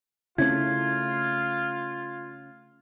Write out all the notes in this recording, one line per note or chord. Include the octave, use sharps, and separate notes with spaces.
C#3 A3 C4 C#4 E4 F4 G#6